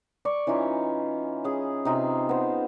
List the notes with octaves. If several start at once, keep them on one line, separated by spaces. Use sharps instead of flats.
D5 C#6
E3 C#4 D#4 F4
C#4 G#4
C3 D#4 F4
B3 C5